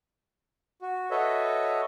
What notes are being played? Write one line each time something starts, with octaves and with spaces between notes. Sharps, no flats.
F#4
F#4 A4 B4 C#5 D#5 E5